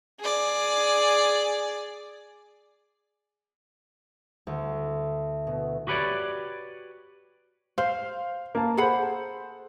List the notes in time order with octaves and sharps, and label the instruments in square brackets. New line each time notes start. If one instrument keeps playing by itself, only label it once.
[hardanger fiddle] G#4 D5
[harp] D2
B2
[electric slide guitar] F#4 G4 B4 C#5 D5
[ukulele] C5 [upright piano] F5
[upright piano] A#3 A5
[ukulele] G#4 F#5 B5 [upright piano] A4 C5